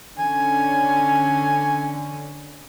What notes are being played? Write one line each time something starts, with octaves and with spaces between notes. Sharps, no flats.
D3 C#4 G#5